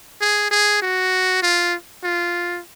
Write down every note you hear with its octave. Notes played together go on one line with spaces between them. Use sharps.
G#4
G#4
F#4
F4
F4